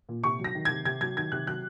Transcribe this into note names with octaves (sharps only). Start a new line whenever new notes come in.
A#2
C3 C#6
F#3
A#6
D#3
C3 G#6
C3 G#6
F#3 G#6
D#3 G#6
C3 F#6
F#3 F#6